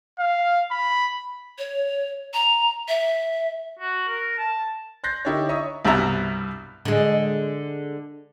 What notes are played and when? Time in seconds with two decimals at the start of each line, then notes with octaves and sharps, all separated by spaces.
0.20 F5
0.71 B5
1.59 C#5
2.34 A#5
2.88 E5
3.79 F#4
4.08 A#4
4.38 A5
5.04 C6 F#6 G6 A6 A#6 C7
5.25 D3 D#4 E4 G4 A#4 C#5
5.49 C#5 D#5 E5 A#5 C#6 D#6
5.85 C2 G2 B2 E5 A#5
6.85 D3 G#3